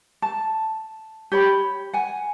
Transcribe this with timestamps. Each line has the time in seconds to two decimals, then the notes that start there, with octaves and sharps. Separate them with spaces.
0.22 A5
1.32 G4 C#5 A#5 B5
1.93 F#5 G#5